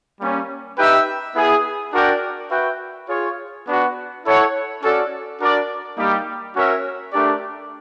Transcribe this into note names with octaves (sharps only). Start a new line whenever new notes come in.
G3 A#3 C#4
D#4 G4 B4 E5 G5
B3 E4 G#4
D4 F#4 A#4 D5 G5
F#4 B4 E5 G5
F4 G#4 C#5
B3 D4 F#4
E4 A4 C#5 F#5
C#4 F#4 A4 D5
D4 F#4 A#4 D5
G3 A#3 D#4 G4
C#4 F#4 A#4 C#5 E5
A3 D4 G4 A#4 D5